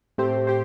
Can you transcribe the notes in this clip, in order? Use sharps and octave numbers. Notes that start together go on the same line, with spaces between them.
A2 A3 C4 G4 C5
G4 C5